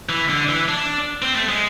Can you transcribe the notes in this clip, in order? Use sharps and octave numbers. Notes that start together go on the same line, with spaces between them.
E3
D3
E3
D4
C4
A3
G#3